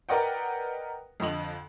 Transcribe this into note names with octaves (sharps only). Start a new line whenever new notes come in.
A#4 B4 D5 D#5 F#5 G5
F2 D3 D#5 F#7